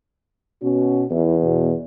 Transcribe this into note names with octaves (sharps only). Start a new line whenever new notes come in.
B2 C#4 F#4
E2 E4
B2